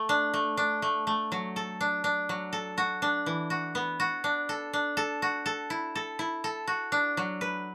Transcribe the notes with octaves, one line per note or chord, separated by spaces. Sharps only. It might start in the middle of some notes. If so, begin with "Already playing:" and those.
Already playing: A3
D4
A3
D4
A3
A3
F#3
A4
D4
D4
F#3
A4
F#4
D4
E3
F#4
B3
F#4
D4
A4
D4
A4
F#4
A4
E4
A4
E4
A4
F#4
D4
F#3
B4